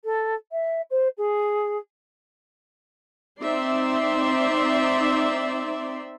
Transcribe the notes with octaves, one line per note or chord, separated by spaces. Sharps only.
A4
E5
C5
G#4
C4 D#4 D5 E5 C6